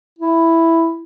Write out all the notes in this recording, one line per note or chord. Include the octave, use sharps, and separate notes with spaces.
E4